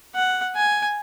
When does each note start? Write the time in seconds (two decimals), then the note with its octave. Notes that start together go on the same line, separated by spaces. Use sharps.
0.15 F#5
0.56 G#5